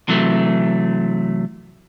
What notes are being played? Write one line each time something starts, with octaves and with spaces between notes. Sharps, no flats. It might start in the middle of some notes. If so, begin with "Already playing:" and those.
C3 E3 F#3 A3